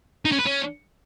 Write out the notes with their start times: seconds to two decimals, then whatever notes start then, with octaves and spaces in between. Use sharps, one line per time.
0.25 D#4
0.32 C#4
0.39 B4
0.46 C#4